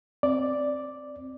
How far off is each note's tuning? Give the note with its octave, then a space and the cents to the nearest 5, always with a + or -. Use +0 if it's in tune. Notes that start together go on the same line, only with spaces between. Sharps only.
C4 +0 D5 +0